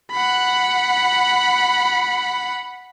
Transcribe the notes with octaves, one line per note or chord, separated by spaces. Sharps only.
F#5 B5